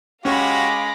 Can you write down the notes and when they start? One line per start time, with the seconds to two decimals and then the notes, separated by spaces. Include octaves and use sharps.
0.25 G#3 C#4 F#4 G4 F5 B5 D6 A#6